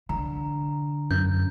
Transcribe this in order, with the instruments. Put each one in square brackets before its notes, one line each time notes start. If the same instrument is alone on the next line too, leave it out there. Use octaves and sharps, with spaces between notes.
[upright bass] D3 [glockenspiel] A#5
[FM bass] F#2 [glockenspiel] G6